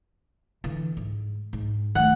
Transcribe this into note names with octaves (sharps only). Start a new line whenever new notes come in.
D3 E3
G#2
G#2
D#3 A3 F#5